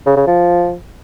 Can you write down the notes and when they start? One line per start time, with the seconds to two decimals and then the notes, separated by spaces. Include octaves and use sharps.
0.06 C#3
0.17 C#3
0.27 F3